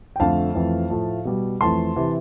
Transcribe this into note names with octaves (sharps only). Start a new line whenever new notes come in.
G5
F2 D3 A3 F5 A5
F2 E3 A3
A2 F3 A3
B2 G3
F2 E3 A3 A5 C6
C3 E3